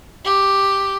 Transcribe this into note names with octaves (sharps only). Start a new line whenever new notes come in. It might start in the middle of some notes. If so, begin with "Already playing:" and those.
G4